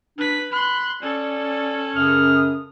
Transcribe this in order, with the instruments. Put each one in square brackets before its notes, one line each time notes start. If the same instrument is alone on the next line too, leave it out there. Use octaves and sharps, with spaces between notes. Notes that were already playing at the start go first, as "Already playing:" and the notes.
[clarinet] D4 [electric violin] B4 B6
[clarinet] B5 [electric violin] C6 F#6
[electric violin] C#4 A4 [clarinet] D5
[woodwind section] F#2 C#3 D#6 [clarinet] F6